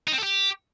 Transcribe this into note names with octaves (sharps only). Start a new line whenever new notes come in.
D#4
C4
A4
G4